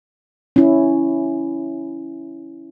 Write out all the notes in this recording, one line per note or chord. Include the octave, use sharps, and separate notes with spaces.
C#4 E4